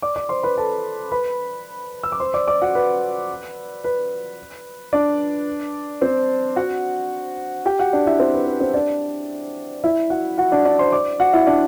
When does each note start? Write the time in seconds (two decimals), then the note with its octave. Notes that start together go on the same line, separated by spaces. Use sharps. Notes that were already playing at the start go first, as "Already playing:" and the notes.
0.02 D5 D6
0.16 D5 D6
0.29 C5 C6
0.43 B4 B5
0.57 A4 A5
1.12 B4 B5
2.03 E6
2.12 D6
2.20 C5 C6
2.34 D5 D6
2.48 D5 D6
2.62 F#4 F#5
2.75 B4
3.84 B4
4.93 D4 D5
6.01 C4 C5
6.56 F#4 F#5
7.66 G4 G5
7.79 F#4 F#5
7.93 D4 D5
8.06 E4 E5
8.20 C4 C5
8.34 B4
8.47 B4
8.60 C4 C5
8.74 D4 D5
9.84 E4 E5
10.10 F#4 F#5
10.38 F#4 F#5
10.52 D4 D5
10.65 D4 D5
10.79 C5 C6
10.92 D5 D6
11.20 F#4 F#5
11.33 E4 E5
11.47 D4 D5